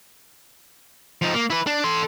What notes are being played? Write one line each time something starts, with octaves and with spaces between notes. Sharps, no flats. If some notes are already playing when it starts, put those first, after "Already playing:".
F3 D#4
A#3
E4 B4
D4
A4 C6